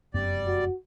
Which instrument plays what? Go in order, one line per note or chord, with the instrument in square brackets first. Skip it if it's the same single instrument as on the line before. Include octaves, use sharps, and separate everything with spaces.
[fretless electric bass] F1 F#2 B3 [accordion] G3 D5
[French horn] F#4